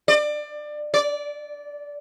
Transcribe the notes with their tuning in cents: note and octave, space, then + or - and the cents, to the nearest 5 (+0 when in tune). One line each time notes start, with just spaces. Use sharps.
D5 +25
D5 -15